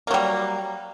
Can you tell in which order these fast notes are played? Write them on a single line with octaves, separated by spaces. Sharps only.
A#3 F#3 G3